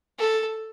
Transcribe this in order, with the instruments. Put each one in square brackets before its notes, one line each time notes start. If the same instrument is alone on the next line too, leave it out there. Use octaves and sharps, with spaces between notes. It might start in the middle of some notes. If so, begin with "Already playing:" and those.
[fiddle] A4